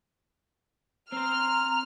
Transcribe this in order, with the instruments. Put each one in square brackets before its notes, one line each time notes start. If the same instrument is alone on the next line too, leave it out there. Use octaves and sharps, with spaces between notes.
[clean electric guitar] C4 C5 [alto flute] A#5 [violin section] F6